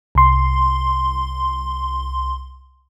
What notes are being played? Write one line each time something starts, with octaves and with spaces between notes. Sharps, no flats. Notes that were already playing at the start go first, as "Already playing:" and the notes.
C2 C6